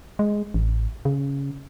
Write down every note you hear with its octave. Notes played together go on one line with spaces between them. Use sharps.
G#3
A1
C#3